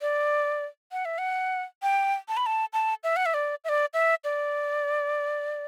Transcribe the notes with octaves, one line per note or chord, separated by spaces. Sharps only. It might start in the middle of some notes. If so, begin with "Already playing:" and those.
D5
F#5
E5
F#5
G5
A5
B5
A5
A5
E5
F#5
E5
D5
E5
D5
E5
D5